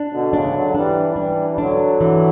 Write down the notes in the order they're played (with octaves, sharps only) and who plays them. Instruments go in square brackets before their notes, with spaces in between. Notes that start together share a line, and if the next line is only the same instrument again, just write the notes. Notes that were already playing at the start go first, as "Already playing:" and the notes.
Already playing: [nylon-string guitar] D4
[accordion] B2 D3
[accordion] C#3 E3 [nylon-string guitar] D4
[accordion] E3
D3 F#3
[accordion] E3 G3 [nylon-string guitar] D4
[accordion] E3 G3 [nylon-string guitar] D4
[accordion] G3
[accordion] D3 F#3 [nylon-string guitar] D4
[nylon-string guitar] E3